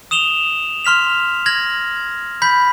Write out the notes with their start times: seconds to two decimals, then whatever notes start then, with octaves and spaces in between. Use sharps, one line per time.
0.11 D#6 E7 F7 G7
0.85 C6 F6 B6 F7
1.46 F6 G#6 A#6 F#7
2.42 B5 G6 B6